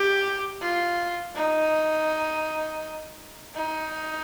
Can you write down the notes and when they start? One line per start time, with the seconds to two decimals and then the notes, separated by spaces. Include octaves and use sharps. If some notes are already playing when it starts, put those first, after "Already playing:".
Already playing: G4
0.62 F4
1.35 D#4
3.55 D#4